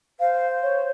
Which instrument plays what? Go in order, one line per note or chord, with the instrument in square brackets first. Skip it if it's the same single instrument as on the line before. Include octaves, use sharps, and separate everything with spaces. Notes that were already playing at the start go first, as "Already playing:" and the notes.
[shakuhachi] C5 [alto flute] F5
[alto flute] C#5